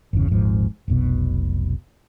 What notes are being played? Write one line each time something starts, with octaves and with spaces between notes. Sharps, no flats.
G1 E2 C#3
D#1 G#1 G#2 F3
F1 B1 B2